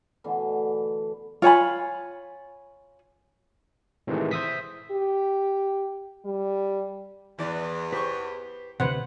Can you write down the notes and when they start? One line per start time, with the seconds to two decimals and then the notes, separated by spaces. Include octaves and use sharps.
0.24 B2 D3 E3 A3
1.42 F4 C#5 G#5 B5
4.07 A2 C3 D#3 E3 G#3 A3
4.31 C5 E5 D#6 B6
4.91 G4
6.25 G3
7.39 E2 E3 D5
7.93 G4 B4 C5 C#6
8.80 D2 G2 C3 B4 C5 F#5